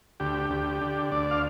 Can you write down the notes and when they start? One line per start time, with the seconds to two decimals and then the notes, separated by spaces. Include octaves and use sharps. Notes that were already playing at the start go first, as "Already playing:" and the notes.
0.20 D2 G4
0.50 D2
0.81 D3
1.12 D2 D5
1.31 F5